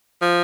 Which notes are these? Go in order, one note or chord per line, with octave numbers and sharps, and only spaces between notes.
F3